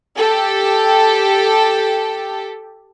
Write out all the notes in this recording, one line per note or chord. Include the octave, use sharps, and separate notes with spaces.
G4 A4